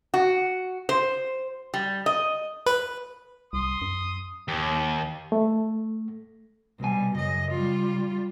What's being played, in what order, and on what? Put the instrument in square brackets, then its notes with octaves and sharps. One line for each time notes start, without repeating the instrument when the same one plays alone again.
[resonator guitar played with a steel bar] F#4
C5
G3
D#5
[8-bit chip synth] B4
[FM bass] C2 [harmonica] C6 D#6
[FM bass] F#2
[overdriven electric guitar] D#2
[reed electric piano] A3
[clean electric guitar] C2 G#5 [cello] B2 G3
[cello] F#2 D#5 [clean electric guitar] C#3
[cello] G3 F4